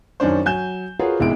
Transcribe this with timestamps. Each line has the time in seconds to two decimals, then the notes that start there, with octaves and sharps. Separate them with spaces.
0.20 F#2 D#3 C#4 D4 C5
0.45 F#3 G#5 G6 E7
0.99 F4 F#4 G#4 A#4 B4 C#5
1.20 F1 E2 G#2 G#3 E4 D7